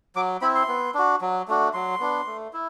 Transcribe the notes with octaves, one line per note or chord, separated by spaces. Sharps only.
F#3 D6
C4 E4 B5
C6
B3
D4 F#4
F#3
A3 D4 F#4
F#3 C6
B3 D4
A3
E4